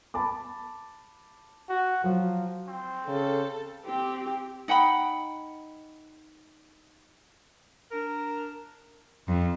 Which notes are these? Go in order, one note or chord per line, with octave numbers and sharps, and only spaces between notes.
A5 B5 D6
F#4
F3 F#3
C4
C#3 A4
C4 G4
D#4 F#5 G5 B5
D4 A#4
F2